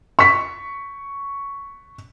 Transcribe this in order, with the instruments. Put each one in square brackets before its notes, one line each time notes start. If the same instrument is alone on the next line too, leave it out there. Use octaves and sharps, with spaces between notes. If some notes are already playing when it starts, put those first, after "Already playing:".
[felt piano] C#6 B6